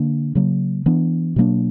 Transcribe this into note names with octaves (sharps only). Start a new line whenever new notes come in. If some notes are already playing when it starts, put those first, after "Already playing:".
Already playing: D3 A#3 D4
C#3 F#3 A#3
E3 B3 D4
B2 F#3 A#3 D4